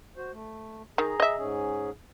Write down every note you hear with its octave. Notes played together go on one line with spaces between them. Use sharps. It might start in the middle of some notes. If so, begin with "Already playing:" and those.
F#4 C5
A3
D#3 G#4 A#5
D#5 E5
G#2 C#4 G#4